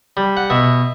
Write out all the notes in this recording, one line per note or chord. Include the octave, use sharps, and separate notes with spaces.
G3
F#5
B2 E5